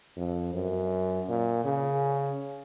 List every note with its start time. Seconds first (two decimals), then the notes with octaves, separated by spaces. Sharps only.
0.16 F2
0.53 F#2
1.28 A#2
1.65 C#3